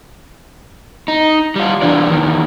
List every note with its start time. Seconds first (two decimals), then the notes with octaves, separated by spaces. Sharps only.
1.08 D#4
1.56 G3 F4
1.82 E2 G#2 E3 D4 D5
2.07 E2 D#3